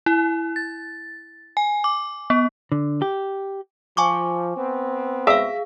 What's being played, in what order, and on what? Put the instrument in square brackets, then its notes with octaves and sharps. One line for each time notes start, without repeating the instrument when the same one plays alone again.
[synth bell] E4
A6
G#5
D6
B3
[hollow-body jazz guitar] D3
G4
[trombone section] F3 [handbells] G#5 C#6 D6
[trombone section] B3 C4
[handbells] G#4 F5 [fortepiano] E5